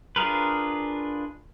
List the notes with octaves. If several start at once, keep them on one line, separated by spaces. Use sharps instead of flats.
D4 F4 G#4 A#4 B4